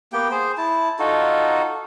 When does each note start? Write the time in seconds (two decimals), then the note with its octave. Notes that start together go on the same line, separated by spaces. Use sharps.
0.13 A#3 B3 G4 G5
0.31 G#4 C5
0.58 E4 A5
0.99 D#4 F4 F#4 A4